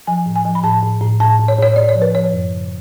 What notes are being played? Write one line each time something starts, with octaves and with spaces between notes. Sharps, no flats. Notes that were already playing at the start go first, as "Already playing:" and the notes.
F3 G#5
A2
G#5
F3
B5
A2 A5
A2
A2
A2 A5
A2
C#5
A2 C#5
A2 D5
C#5
F3
B4
F3 C#5
F#2
C#3